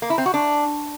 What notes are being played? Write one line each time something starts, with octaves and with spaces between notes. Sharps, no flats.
A#3
E4
C4
F#4
D4